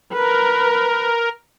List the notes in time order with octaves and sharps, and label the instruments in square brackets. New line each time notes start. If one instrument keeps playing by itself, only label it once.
[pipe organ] A#4 [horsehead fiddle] B4